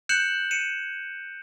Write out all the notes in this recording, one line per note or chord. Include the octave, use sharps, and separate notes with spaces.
F#6 G6 C#7 E7 F#7
C#7 D#7 E7